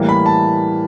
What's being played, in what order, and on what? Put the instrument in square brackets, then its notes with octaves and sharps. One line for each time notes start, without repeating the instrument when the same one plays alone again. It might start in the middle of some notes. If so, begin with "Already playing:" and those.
Already playing: [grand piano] A2 E3 G3 A#3
B5
A5